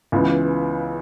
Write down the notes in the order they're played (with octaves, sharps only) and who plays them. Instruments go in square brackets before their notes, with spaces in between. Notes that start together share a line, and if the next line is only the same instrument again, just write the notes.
[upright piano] C#2 C#3 E3 B3